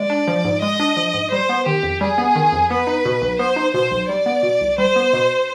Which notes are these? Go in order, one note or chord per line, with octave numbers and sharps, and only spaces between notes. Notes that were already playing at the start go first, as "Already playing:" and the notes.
Already playing: G#3 D5
D4
F3
G#2
G#3 D#5
D4
F3
G#2
G3 C5
B3
D#3 G4
F2
G3 G#4
B3
D#3
F2
B3 B4
D#4
B2
B1
B3 C5
D#4
B2 C5
B1
G3 D5
B3
B2
C2
G3 C5
B3
B2